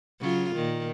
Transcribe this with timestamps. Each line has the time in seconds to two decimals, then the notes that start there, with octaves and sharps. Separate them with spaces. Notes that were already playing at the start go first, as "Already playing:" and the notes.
0.20 C#3 F#3 F4
0.56 A#2 D#3